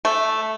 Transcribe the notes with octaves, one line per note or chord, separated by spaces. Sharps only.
A3